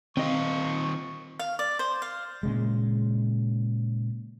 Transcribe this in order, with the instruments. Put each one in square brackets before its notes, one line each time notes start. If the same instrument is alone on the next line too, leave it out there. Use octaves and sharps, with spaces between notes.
[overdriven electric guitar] D#3 F4 [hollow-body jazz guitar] C4 D#5 [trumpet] C#6
[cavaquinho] F5
D5
C5
F5
[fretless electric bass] A#2 C#3 G#3